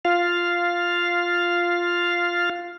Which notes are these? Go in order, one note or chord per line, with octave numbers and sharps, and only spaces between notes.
F4 F5